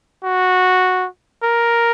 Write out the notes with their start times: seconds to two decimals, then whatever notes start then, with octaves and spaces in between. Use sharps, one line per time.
0.24 F#4
1.43 A#4